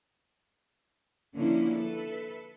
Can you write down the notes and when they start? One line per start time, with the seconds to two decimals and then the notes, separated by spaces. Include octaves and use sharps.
1.36 D3 F3 A#3 C#4 E4
1.74 A4 B4 E5